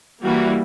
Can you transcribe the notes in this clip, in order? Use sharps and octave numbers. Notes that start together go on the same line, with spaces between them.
E3 G3 A#3 F#4